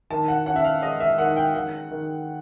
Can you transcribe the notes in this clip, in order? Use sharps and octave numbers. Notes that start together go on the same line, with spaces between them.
D#3 A5
F#5
C#4 F#5
E5
F5
G#3 D#5
E5
D#3 F#5
G5
D#3 F#5
D#3